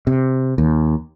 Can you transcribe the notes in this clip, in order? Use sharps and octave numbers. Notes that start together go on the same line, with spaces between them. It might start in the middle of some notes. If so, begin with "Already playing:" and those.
C3
D#2